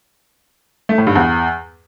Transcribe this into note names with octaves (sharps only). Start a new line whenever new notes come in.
A3
A2
G2
E2